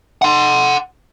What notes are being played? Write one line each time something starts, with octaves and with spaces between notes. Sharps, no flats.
F#5 C6